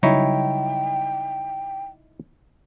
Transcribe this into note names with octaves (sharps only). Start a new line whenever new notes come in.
C#3 F#3 G3 D#4 E4 C#5 G5